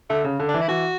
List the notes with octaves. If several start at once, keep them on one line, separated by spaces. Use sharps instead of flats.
D3 A3
C#3
D3
D4
E3
E4
E3 F#4